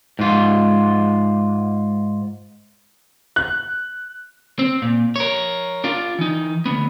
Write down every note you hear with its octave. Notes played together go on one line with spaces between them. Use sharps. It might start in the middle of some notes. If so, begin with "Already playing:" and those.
G#2 F4
F#6
C4
A#2
A#4 C#5
D4 F4
E3 D#4
D2 B3